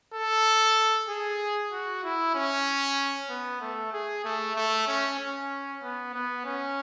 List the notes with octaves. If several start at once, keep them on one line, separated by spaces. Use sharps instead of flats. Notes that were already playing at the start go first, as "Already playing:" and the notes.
A4
G#4
F#4
E4
C#4
B3
A3
G#4
A3
A3
C#4
C#4
B3
B3
C#4